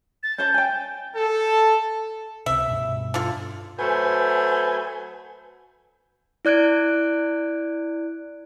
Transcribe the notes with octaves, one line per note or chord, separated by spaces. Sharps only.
A6
C#4 C5 A5 G6
G5 G#5
A4
C#2 C3 E5
G2 B2
D3 F4
F#3 A3 B4 C5 G#5
E4 D5 F#6 G#6 D7